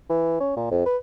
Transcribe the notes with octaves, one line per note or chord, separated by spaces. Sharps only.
E3
C#4
A#2
F2
B4